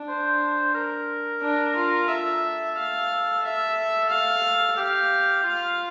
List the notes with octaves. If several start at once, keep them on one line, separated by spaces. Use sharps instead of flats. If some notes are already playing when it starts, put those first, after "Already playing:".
Already playing: D4
C5
A#4
D4
F4
A4 E5
F5
E5
F5
G4 F5
F4 F5